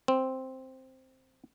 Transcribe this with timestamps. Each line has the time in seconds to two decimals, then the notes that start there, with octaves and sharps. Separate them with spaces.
0.08 C4